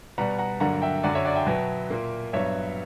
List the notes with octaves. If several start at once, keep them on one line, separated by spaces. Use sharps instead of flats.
B2 G3 B3 F#5 A#5
F#5 A#5
G2 D3 F#3 A#3 F#5 A#5
E5 G5
F#2 D3 F#3 D5 F#5
C#5 E5
D5 F#5
E5 G5
B2 F#3 B3
A#2 A#3
G2 F#3 B3 C#5 E5